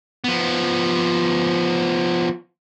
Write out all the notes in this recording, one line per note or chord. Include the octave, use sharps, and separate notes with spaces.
F3 B3